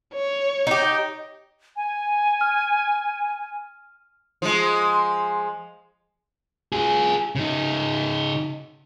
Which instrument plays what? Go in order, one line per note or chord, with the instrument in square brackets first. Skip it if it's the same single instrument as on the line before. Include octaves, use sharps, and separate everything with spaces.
[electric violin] C#5
[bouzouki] D#4 G4
[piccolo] G#5
[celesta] F6
[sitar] F3 G#3
[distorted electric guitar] F4 G#4
C#3 D#4